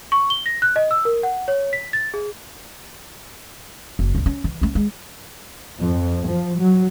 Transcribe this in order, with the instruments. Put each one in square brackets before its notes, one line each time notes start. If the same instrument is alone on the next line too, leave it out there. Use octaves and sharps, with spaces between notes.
[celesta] C#6
G7
A#6
F#6
D#5
E6
A#4
F#5
C#5
B6
A6
G#4
[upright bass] F#1
E2 D4
C#4
E3
A3 C#4
G#3
[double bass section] F2
F3
F#3